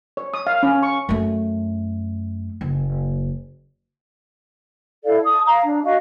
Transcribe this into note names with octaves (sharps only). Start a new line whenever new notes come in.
C#5
D#6
F5
C#4
C#6
F#2 A3
F#1
E4 A4 D5 F5
A5 D#6
C#5 F5 A#5
D4
F#4 D#5 F5